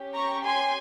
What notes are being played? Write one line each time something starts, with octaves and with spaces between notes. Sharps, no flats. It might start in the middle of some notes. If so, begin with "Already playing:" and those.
Already playing: C#4 G4
A#5 C#6
G#5 C6